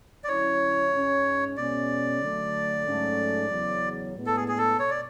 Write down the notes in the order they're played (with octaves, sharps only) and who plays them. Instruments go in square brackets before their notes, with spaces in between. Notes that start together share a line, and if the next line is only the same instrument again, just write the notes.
[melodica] D5
[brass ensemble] D3 F#3 C#4 E4 [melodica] C#5
[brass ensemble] G#2 G#3 C#4
[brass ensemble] B2 G#3 C#4 [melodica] D5
[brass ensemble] D3 F#3 A3
G#2 F#3 A3 C#4
E2 C#3 F#3
A2 G#3 B3 D4
[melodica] A4
G#4
G#4
A4
[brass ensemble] B2 [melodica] C#5
[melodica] D5